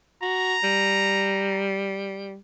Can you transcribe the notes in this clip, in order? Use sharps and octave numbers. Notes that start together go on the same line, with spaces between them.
F#4 A#5
G3